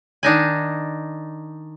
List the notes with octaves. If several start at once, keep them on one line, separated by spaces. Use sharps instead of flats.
D#3 D4 D#4 G#5